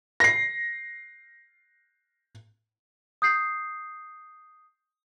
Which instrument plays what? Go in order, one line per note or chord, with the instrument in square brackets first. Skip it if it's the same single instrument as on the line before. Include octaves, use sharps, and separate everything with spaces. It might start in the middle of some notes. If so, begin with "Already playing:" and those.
[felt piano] A#6 C7
[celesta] D#6 G6 C7